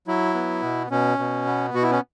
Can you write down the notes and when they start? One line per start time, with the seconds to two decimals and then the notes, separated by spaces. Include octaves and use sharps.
0.07 F#3 E4
0.34 B3
0.62 B2
0.90 B2 C#4
1.19 B2
1.47 B3
1.74 B2 F#4
1.82 E4
1.91 C#4